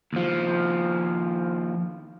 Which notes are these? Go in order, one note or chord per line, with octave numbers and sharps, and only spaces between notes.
D#2 F3